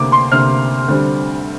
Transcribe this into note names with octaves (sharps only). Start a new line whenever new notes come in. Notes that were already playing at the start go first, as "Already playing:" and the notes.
Already playing: D2 C3 A#3 D6
C6
D2 C3 A#3 F6
D2 D3 G3 C4